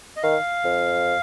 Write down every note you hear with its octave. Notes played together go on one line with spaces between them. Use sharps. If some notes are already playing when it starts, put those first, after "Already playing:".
D#5
D#3 F5
F2